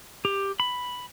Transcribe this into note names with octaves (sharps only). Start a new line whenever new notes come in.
G4
B5